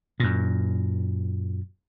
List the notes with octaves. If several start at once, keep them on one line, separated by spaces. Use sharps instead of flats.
F#2 A#2